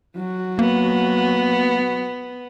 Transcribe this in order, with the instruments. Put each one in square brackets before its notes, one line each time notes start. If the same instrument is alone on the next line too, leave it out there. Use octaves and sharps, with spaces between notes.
[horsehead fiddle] F#3 F#4
[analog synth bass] A#3 [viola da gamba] B3